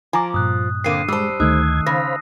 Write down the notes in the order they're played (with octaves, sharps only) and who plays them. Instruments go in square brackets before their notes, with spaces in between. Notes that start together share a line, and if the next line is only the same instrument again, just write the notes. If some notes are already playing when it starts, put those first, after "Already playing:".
[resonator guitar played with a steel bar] F3 [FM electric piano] G#5 A#5 D6
[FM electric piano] G2 A#2 [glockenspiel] D#6 F#6
[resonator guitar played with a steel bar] D3 A#3 C4 [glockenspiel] C7 D#7
[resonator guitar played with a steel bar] G3 C5 [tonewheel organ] G#3 [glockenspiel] A5 E6
[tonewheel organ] D2 G#6 [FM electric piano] D#3 A3 D#4 [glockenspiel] D#6 E6 F#6
[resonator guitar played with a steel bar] C#3 [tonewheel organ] C5 F5 B5 [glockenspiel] A#6